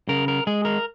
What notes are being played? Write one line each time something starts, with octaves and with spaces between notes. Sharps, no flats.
C#3 A#4
A#4
G#3 G#4
A#4